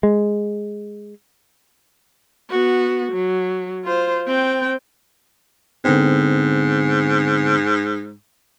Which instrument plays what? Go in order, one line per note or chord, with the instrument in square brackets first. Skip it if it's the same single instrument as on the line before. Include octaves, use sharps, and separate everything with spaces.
[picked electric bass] G#3
[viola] B3 F#4
F#3
F4 C5
C4 G5
[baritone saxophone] G#2 [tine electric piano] D3 B3 C4